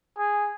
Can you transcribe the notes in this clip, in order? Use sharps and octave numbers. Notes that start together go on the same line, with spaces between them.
G#4